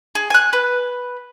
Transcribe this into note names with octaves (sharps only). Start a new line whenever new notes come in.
G#4
G#5 F#6
B4